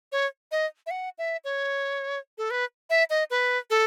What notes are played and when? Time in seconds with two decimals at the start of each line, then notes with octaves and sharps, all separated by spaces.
0.12 C#5
0.51 D#5
0.86 E5
0.90 F#5
1.18 E5
1.44 C#5
2.38 A4
2.50 B4
2.90 E5
3.10 D#5
3.30 B4
3.70 A4